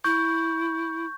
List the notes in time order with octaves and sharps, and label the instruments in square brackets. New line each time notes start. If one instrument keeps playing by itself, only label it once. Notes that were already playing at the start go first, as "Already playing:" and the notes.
[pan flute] E4 [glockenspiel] C#6 G6